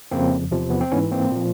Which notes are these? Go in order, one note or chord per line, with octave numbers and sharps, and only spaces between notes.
F2 C#3 F3 A#3 C4
E2 C3 F3
B3
C4
G#2 E3 B3 C#4
A#3 C4
A#2 F3